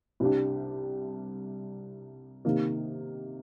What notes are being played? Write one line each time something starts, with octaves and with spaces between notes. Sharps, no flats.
C2 C3 G3 D4 G4
C3 D#3 A#3 D#4